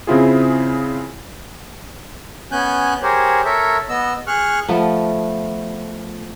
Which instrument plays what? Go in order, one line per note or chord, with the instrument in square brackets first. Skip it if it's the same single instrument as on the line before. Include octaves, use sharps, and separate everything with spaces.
[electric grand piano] C#3 C4 E4 F4 G#4
[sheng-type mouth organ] B3 C#4 G#5 F#6 G6
G4 G#4 A#4 C5 C#5
A4 A#4 C#5 E5
B3 D#5 E6
G#4 C#6 F6 F#6
[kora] F3 A3 B3